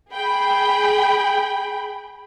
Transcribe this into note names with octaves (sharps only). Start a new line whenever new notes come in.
G#4 G5 B5